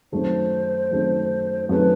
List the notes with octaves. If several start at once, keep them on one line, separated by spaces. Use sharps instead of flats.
F#2 D#3 A3 C4 C5
F#2 D#3 A3 C4
F#2 D#3 A3 C4 B4